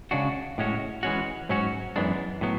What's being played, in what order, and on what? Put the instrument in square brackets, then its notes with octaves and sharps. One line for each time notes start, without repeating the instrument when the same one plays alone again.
[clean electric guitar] C#3 G#3 D4 F#4
A2 G#3 C#4 F#4
E3 G#3 C#4 F#4
G#2 F#3 C#4 F#4
F#2 E3 G#3 B3 D4
A2 F#3 B3